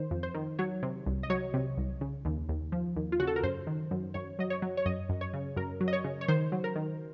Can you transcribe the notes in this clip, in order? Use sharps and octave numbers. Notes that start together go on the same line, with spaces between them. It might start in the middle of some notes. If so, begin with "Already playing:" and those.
Already playing: D#3 C5
F2
C5
D#3
F#3 C#5
C3
C2
D#5
F#3 C#5
C3
C2
C#3
D#2
D#2
F3
D#2
F4
C#3 F#4
A4
A#4
F#2 C5
D#3
F#2
F#2 C#5
F#3 D#5
C#5
F#3
C#5
F#2 D#5
F#2
C#5
C#3
F#2 A#4
F#3
D#5
C#5
C#3
C#5
D#3 C5
F#3
A#4
D#3